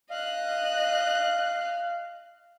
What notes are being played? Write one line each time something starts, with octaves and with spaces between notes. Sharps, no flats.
D#5 F5 F#6